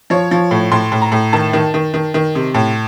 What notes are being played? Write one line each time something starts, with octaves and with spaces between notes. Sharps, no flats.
F3 C#5
F3
A2
A2 C6
A2
A#5
A2
D#3 A5
D#3
D#3
D#3
D#3
C3
A2